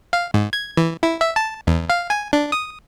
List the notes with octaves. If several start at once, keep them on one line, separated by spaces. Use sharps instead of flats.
F5
G#2
G#6
E3
E4
E5
A5
E2
F5
G#5
D4
D#6